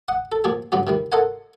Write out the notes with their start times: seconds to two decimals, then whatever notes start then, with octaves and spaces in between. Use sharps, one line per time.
0.08 F#5 D#6
0.32 A4
0.44 A#2 F3 G4 G#4
0.72 G2 C#3 F#3 C#4 G4
0.87 C3 D#3 G3
1.12 A4 A#4 C5 D#5 F#5 G#5